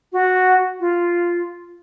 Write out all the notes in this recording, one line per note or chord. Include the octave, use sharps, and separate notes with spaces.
F#4
F4